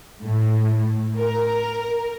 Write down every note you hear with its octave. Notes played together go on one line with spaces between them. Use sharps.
A2
A#4